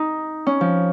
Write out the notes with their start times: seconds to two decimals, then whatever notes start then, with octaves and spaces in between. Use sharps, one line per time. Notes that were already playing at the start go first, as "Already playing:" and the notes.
Already playing: D#4
0.47 C#4
0.61 F3